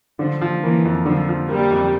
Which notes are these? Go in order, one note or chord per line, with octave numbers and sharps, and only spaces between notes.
D3 F3
F3
E3 A#3
F2
D3 F3
F3
G3 A#3
F2